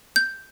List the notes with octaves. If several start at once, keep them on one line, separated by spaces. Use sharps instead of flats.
G6